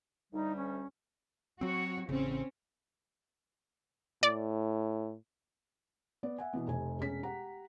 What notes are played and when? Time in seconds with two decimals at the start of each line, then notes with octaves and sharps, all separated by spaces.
0.33 D2 G3 D#4
0.57 C#4
1.61 F#3 C4 F#4 C#5
2.09 A1 C#3 C4 C#4
4.23 A2 D5
6.23 B3 D5
6.38 E5 F#5 G#5
6.53 B2 E3 B3
6.67 F1 C3 G#5
6.99 E1 C#4 B6
7.23 G4 F#5 A#5